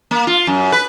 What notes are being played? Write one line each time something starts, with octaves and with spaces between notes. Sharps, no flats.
A#3
F4
F#2
B4